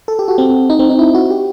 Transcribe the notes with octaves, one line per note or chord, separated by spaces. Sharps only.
A4
G4
F#4
C4
D#4
C4
D#4
E4
F#4
G4